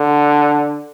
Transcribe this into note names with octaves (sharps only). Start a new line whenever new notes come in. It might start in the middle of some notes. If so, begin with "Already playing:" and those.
Already playing: D3